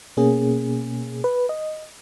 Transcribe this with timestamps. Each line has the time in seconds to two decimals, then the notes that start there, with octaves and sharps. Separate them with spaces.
0.17 B2 A#3 C#4 G#4
1.24 B4
1.49 D#5